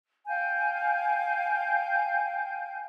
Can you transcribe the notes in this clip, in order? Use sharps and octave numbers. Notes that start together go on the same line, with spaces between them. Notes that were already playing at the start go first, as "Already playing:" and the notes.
F5 G5 G#5 G6